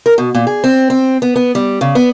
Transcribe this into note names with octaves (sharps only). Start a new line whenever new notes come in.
A#4
B2
A#2
G#4
C4
C4
B3
B3
G3
C#3
B3